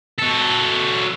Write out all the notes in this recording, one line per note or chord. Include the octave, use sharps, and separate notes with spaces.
F#3 A4